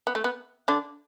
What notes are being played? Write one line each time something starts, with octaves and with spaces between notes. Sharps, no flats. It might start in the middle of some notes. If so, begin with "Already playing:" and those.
B3
A3
B3
D3 D4